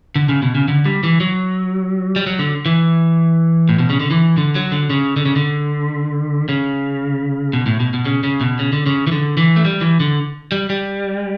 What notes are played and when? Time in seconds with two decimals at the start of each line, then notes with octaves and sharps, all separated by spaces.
0.16 D3
0.29 C#3
0.42 B2
0.55 C#3
0.68 D3
0.86 G3
1.03 E3
1.20 F#3
2.16 G3
2.26 F#3
2.39 D3
2.66 E3
3.69 A2
3.79 B2
3.90 C#3
4.00 D3
4.10 E3
4.38 D3
4.55 F#3
4.72 D3
4.90 C#3
5.16 D3
5.26 C#3
5.36 D3
6.49 C#3
7.53 B2
7.66 A2
7.80 B2
7.94 B2
8.06 C#3
8.24 C#3
8.41 B2
8.59 C#3
8.73 D3
8.86 C#3
9.07 E3
9.12 D3
9.37 E3
9.56 A3
9.65 G3
9.81 E3
10.00 D3
10.52 G3
10.70 G3